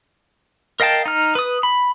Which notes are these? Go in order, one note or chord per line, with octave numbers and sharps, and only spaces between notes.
A#4 D#5 F5 G5 A5
D#4 F6
B4 D#6
B5